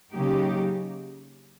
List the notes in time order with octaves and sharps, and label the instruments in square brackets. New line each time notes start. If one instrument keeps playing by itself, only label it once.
[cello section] C#3 F#3 A#3 D#4 G4